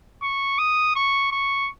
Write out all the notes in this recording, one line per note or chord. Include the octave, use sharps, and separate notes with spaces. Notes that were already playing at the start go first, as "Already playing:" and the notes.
C#6
D#6
C#6
C#6